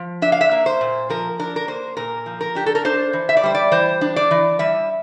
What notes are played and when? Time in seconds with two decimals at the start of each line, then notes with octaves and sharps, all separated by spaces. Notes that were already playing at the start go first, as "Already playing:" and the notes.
Already playing: F3
0.22 D4 E5
0.32 F5
0.41 E5
0.51 A#3
0.66 C5
0.81 A#2
1.10 F3 A#4
1.39 D4 A#4
1.56 A#4
1.68 A#3 C5
1.97 A#2 A#4
2.26 F3
2.41 A#4
2.55 D4 G4
2.66 A4
2.75 A#4
2.85 D4 C5
3.13 E3
3.29 E5
3.37 D5
3.43 G3 C5
3.55 D5
3.71 E3 C5
4.01 D4
4.16 D5
4.31 E3
4.59 G3 E5